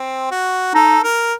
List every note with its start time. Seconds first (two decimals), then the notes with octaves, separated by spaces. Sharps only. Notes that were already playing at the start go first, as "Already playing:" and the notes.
Already playing: C4
0.32 F#4
0.74 D#4 A4
1.03 A#4